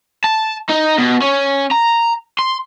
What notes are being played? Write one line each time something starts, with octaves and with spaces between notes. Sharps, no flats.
A5
D#4
B2
C#4
A#5
C6